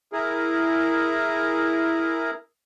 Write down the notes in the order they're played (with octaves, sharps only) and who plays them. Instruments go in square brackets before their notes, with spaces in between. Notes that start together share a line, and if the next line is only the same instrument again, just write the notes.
[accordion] E4 G#4 A#4